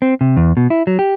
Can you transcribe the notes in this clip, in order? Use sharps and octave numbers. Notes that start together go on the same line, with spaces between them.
C4
C3
E2
B2
E4
F#3
G4